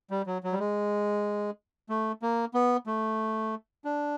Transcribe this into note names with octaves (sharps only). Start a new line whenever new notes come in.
G3
F#3
F#3
G3
G#3
A3
A#3
B3
A3
D4